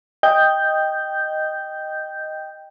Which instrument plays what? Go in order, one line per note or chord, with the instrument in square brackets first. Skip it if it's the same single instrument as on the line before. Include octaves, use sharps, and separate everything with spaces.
[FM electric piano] D#5 G5 G6